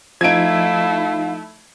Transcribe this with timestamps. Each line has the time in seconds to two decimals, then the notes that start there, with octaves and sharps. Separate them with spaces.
0.21 F3 A3 D#4 E4 F5 G#6 D7